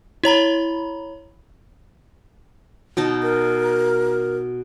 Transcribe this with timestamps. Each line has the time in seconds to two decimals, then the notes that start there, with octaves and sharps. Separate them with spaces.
0.24 E4 C#5 A#5 B5
2.97 B2 D#4 A5
3.23 A#4